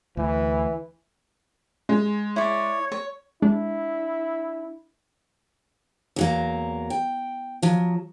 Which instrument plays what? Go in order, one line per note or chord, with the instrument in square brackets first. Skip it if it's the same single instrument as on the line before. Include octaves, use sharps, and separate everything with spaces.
[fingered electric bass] D2 [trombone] E3
[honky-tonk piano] G#3
[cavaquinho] E4 D5 [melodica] C#5
[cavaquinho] C#5
[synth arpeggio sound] G#3 [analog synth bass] D4 [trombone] E4
[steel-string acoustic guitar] E2 F#3 A#3
G5
F3 F#3